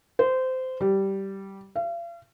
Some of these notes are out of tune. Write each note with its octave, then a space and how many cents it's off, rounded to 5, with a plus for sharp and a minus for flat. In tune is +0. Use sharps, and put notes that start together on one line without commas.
C5 -20
G3 -10
F5 -40